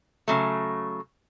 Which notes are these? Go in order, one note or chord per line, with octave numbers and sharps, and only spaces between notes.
C#3 F#3 A3